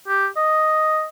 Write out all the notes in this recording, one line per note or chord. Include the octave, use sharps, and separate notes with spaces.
G4
D#5